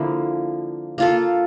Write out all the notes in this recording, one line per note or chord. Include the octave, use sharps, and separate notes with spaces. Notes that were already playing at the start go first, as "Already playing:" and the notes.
Already playing: D3 F3 A#3 E4
A#3 F4 A4